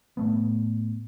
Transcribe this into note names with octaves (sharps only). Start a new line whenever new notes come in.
A2 A3 B3